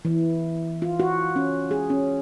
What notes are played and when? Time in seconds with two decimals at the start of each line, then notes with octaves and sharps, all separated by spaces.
0.05 E3
0.82 F4
1.00 F#4
1.36 C#4
1.71 G#4
1.90 C#4